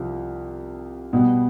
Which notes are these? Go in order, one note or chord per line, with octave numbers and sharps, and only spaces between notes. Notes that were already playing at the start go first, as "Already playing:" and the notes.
Already playing: C2 C3 F3
B2 G3 B3